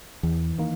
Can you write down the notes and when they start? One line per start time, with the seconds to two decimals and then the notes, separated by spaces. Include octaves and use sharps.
0.23 E2 E3
0.58 D#3 A#3